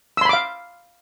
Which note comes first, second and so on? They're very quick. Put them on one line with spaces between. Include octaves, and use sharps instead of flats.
E6 C6 B5 D6 F5